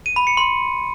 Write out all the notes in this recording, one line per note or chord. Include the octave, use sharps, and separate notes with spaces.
D#7
B5
C#7
C6